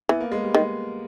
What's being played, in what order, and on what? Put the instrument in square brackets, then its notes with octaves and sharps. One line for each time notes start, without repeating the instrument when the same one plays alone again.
[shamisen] E3 [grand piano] B3
[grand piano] A#3
G#3
G3
[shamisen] D#3 [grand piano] G#3